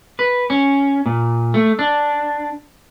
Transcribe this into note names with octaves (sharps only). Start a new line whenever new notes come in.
B4
C#4
A#2
A3
D4